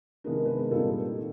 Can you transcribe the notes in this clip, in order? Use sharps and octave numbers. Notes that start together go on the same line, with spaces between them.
C3 D#3 G#3 B3 D4 A#4
B4
A#4
A#2 G3 C4 D#4 A4
D#3